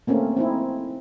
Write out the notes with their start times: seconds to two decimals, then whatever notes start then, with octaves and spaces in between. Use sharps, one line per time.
0.07 A3 A#3 C4 C#4
0.37 C4 D#4 E4